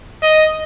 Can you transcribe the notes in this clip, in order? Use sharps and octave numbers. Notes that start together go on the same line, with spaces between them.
D#5